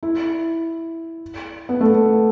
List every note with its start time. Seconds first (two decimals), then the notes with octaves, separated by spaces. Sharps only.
0.03 E4
1.69 B3
1.81 A3